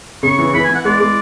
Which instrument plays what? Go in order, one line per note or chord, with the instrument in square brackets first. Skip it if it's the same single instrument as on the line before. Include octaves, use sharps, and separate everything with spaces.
[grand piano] C#3 [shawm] C#6
[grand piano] E3
[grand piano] E3 [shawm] B5
[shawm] G#5
[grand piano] E3
[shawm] F#5
[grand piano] G#3 [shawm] D5
[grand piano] G#3